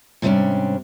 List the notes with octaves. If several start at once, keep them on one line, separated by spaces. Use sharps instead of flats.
G#2 C3 G3 A3 C#4 D4